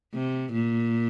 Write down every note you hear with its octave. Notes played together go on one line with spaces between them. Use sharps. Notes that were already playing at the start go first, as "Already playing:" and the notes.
C3
A#2